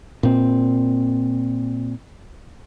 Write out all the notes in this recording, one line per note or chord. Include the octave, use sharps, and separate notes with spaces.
A#2 C4